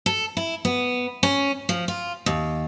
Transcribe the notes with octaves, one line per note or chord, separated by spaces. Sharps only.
A4
E4
B3
C#4
F3
F4
D#2